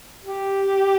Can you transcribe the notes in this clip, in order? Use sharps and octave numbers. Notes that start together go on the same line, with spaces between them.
G4